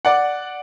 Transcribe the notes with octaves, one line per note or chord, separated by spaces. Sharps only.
D5 F#5